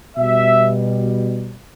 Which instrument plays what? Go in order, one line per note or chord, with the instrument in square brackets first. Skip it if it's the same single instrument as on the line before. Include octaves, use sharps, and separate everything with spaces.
[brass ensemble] B2 G3 E5